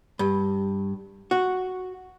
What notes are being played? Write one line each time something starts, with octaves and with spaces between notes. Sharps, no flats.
G2
F#4